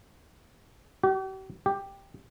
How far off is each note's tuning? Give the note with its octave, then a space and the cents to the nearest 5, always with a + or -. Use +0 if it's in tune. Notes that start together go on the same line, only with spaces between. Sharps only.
G4 -45
G4 +5